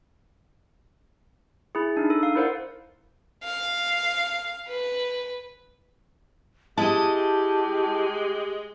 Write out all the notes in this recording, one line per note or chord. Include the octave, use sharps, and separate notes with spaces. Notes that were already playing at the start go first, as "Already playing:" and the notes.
E4 G#4
D4 D#4
A4
F5
E4 A#4 C5 D5 F#5
F5
B4
G#3 E4 G4 D#5 A5